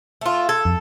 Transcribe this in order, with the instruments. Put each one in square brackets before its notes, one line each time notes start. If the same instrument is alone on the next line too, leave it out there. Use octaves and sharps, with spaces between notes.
[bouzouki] A3 F4
[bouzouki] A4 [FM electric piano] G#6
[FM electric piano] F2